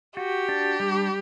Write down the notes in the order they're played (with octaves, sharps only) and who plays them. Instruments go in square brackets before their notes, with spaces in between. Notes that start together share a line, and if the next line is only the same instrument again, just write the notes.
[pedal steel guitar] F#4 [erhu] G4
[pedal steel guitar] D4
G3